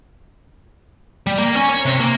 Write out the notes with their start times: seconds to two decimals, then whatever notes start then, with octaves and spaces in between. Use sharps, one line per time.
1.27 G3
1.38 A#3
1.56 C#4
1.69 C#5
1.85 C3
2.00 A#3